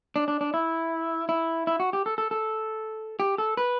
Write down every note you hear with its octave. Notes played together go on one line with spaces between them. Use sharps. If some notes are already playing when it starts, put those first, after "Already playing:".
D4
D4
D4
E4
E4
E4
F#4
G4
A4
A4
A4
G4
A4
B4